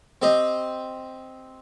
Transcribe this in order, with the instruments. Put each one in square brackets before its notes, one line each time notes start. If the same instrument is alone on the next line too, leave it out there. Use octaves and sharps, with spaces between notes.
[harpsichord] C4 G4 C5 D#5